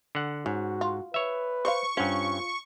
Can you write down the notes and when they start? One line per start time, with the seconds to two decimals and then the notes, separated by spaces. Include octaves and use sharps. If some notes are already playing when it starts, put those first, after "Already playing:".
0.15 D3 F#5
0.46 G#2 C#4 F#4
0.81 F4
1.14 B4 C#5 E5
1.65 C5 D5 F5 C#6
1.97 G2 C#4 F4 C5 F#5